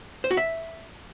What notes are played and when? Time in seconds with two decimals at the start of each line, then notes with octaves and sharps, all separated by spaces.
0.24 C5
0.31 F#4
0.37 E5